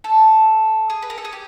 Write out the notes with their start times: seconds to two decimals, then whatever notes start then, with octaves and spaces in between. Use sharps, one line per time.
0.04 A4
0.90 G#4
1.02 B4
1.10 A#4
1.18 A4
1.25 G#4
1.33 G4